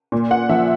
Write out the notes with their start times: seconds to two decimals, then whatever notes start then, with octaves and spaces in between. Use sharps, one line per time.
0.12 A#2
0.31 F#5
0.49 F3 E5